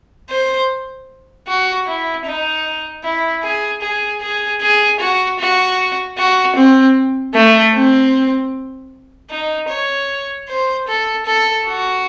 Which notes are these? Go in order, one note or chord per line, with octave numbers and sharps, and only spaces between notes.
C5
F#4
E4
D#4
E4
G#4
G#4
G#4
G#4
F#4
F#4
F#4
C4
A3
C4
D#4
C#5
C5
A4
A4
F#4